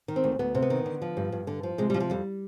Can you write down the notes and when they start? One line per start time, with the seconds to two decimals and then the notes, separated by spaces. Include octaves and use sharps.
0.08 D#3
0.16 C4
0.24 D2
0.39 D2 B3
0.55 C3
0.62 B3
0.70 D#3
0.86 D3
1.02 F3
1.17 G2
1.32 G2
1.47 D3
1.63 F3
1.78 C3 G#3
1.90 F3 G3
2.00 F3
2.10 F2 G3